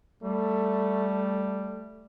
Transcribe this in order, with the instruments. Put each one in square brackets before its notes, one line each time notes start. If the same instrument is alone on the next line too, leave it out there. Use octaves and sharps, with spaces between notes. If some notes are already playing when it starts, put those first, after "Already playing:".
[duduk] G3 [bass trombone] A3